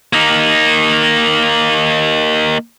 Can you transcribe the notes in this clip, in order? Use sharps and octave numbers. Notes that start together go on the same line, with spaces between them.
A#3 D#4